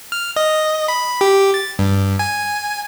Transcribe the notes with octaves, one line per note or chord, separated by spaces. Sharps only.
F6
D#5
B5
G4
A6
G2
G#5